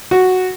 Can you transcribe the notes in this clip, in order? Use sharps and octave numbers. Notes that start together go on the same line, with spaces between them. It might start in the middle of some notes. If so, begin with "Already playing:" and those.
F#4